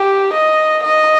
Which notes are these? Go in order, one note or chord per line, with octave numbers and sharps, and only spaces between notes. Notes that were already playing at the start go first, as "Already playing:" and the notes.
Already playing: G4
D#5
D#5